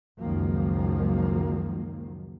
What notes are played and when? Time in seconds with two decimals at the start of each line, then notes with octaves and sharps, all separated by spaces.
0.20 C#2 F#2 D#3 F3 F#3 A#3